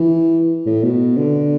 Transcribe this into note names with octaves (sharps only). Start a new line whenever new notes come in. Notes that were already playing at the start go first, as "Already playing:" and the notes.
Already playing: E3
A2
B2
D3